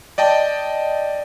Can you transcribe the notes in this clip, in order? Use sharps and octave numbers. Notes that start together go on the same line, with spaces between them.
D5 D#5 G5 A5